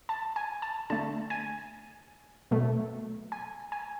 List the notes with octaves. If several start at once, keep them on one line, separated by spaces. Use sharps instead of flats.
A5
G#5
A5
D3 A3 A5
G#5
B2 F#3 A3
G#5
G#5